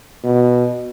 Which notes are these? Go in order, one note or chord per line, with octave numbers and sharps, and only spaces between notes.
B2